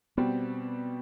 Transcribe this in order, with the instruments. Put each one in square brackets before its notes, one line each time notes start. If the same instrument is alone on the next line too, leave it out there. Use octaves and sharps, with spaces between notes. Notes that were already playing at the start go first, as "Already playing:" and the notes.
[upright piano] B2 G3 C4 [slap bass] B3